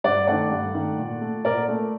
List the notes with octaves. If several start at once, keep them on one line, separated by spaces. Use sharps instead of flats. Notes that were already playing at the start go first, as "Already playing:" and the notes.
G2 D5 F#5
D#3 A3 D5 F#5
G2
D#3 A3
A#2
A3
A#2 A#4 D5
A3